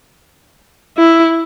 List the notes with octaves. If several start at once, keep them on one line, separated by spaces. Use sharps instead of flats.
E4